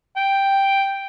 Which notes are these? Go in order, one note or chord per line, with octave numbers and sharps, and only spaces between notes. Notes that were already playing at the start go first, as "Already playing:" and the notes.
G5